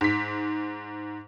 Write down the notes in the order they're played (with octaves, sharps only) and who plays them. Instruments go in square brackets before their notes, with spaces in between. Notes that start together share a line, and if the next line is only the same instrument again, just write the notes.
[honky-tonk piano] G#2 B6